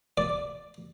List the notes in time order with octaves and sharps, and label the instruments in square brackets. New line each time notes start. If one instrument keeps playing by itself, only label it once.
[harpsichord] D5